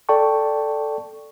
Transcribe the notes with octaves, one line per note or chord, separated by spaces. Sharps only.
A4 D5 G5 A5 C#6